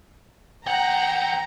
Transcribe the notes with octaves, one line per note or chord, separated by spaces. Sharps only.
E2 F#5 G5 A#5